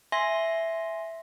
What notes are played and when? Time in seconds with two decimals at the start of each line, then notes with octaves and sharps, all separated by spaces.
0.12 E5 G#5 C6 A#6